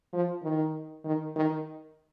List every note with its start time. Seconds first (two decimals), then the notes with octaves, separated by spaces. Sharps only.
0.13 F3
0.44 D#3
1.05 D#3
1.36 D#3